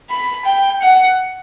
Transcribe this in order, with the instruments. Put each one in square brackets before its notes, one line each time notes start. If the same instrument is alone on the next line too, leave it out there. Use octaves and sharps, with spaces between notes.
[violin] B5
G5
F#5